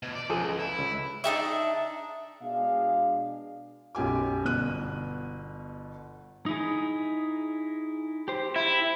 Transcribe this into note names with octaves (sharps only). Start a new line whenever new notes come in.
B2
D5
C#2 F3 G#4 A4
E4
C#2
D4 D#4 G4 E5
B2 G#3 D4 G#4 F5
B1 F#2 G4 G#5 D6
G1 B2 F#6 D#7
D#4 E4 G#4
G4 C5
E4